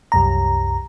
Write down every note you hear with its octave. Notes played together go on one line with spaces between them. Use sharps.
C2 F#2 A#5